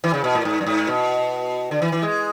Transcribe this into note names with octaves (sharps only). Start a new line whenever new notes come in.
E3
C#3
B2
A2
G#2
F#2
G#2
B2
D3
E3
E3
G#3